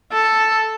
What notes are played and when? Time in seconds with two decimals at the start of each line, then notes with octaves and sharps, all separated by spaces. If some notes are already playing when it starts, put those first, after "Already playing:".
0.12 A4